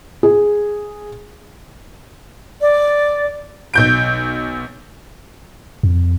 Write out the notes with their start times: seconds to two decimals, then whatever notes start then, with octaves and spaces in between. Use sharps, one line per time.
0.23 G#4
2.61 D5
3.74 B1 G6 D7
5.83 F2